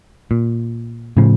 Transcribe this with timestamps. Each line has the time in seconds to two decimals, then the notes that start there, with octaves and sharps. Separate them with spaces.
0.31 A#2
1.17 A2 C#3 F3